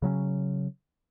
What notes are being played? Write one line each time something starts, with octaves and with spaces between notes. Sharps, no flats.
C#3 F#3 C4 C#4